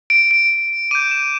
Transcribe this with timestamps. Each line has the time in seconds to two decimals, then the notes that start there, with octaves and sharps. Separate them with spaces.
0.10 D7
0.31 D7
0.91 D6 G6 D#7
1.11 E7